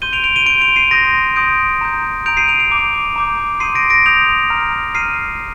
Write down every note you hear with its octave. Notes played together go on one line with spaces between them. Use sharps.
C6 G6 D#7 G7
D7 F7
D7 F7
D#7 G7
C6 G6 D7 F7
D7 F7
C7 D#7
C6 D#6 G6 A#6 D7
C6 D#6 G6 A#6 D7
A#5 D#6 G6
A#5 D#6 G6 D7 F7
C7 D#7
D7 F7
D7 F7
A#5 D6 G6
A#5 D6 G6
C6 D#6 G6 C7 D#7
A#6 D7
A#6 D7
C6 D#6 G6 D7 F7
A#5 F6
A#5 F6 C7 D#7